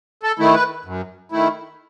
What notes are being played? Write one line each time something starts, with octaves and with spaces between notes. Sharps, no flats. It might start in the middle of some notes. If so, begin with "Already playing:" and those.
A4
D#3 A3 E4
B4
F#2
D#3 A3 E4